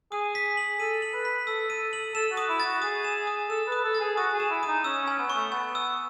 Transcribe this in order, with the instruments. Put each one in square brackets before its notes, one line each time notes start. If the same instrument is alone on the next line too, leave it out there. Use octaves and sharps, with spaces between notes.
[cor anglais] G#4 [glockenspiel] D#6
[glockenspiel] B6
F#7
[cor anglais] A4 [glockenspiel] D#7
[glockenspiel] F#7
[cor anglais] B4
[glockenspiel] B6
[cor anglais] A4 [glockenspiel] E6
[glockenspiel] D#7
F#7
[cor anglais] A4 [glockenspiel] E7
[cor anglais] F#4
[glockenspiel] D#6
[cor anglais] E4
[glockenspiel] A6
[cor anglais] F#4
[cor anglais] G#4 [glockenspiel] D#6
[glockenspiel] E7
D#6
[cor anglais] A4 [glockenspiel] E7
[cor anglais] B4
[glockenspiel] D#6
[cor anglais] A4
[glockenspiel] A6
[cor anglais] G#4
[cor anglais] F#4 [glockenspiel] D#6
[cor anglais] G#4
[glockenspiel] E7
[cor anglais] E4
[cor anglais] D#4 [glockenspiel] D#6
[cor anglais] C#4 [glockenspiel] E6
[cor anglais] C#4
[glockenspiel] G#5
[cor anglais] B3
[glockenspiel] C#6
[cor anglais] A3
[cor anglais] B3 [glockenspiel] G#5
[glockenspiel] E6